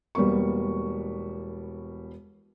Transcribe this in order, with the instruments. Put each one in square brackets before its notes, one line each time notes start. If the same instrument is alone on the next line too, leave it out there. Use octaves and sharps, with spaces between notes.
[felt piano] E1 G3 A#3 B3 C#6